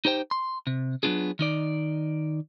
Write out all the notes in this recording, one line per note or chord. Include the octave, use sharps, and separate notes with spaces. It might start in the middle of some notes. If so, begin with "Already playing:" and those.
D#4 G4 C5 G5
C6
C3
F#3 A#3 B3 D4 F4 G#4
D#3 D#4 D5